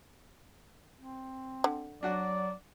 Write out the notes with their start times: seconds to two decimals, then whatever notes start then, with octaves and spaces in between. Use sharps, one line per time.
0.98 C4
1.64 D3
2.03 F#3 D4 F#4 D5 F#5